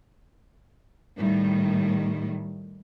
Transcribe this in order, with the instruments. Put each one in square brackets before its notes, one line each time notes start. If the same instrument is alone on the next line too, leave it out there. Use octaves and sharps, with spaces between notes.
[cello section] A2 D#3 G3